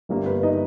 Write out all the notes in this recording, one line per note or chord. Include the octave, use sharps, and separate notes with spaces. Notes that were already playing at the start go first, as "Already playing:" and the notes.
G1 G2 G3 A#3
B4
D#4 D#5